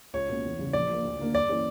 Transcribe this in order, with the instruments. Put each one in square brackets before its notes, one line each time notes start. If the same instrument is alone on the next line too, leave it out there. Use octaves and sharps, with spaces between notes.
[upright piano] C#2 [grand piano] C#5
[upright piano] B2 A#3 C#4
E2
C#3 G3
[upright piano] A#1 [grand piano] D5
[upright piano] A#2 A#3
D2
D3 A#3 D4
[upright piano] G2 [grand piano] D5
[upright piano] E3 A#3 C#4 G4